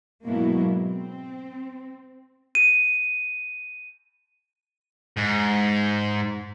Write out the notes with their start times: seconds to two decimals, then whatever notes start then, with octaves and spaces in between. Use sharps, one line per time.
0.24 G#2 B2 F#3 A#3 B3 E4
0.81 C4
2.55 D#7
5.17 G#2